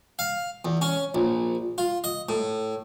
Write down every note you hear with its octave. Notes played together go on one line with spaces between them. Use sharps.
F5
E2
C#4
A#1
F4
D#5
A2